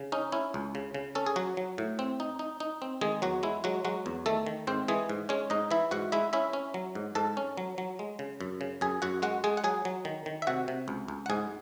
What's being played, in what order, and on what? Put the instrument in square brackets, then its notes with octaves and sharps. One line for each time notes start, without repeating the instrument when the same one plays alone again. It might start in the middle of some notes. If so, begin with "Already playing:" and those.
Already playing: [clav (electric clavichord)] C#3
C#4 D#4
C#4 E4
C#2
C#3
C#3
C#4 A4
G#4
F#3 F#4
F#3
A2
C4
D#4
D#4
D#4
C4
D#3 G#3 G#4
E2 F#3 F#4
G#3 E4
F#3 G#3 F#4
F#3 G#3 F#4
E2
D#3 A3 A4
D#3
G#2 C4 C5
E3 G#3 G#4
G#2
G#3 C#4 C#5
G#2 D#4 D#5
E3 E4 E5
G#2 F#4 F#5
G#3 E4 E5
C#4 E4 E5
C#4
F#3
G#2
G#2 A4 A5
C#4
F#3
F#3
G#3
C#3
F#2
C#3
F#2 G#4 G#5
F#2 F#4 F#5
G#3 F#4 F#5
G#3 G#4 G#5
F#5
F#3 G#4 G#5
F#3
D#3
D#3
E5
C3 F#4 F#5
C3
C#2
C#2
F#5
G#2 G#4 G#5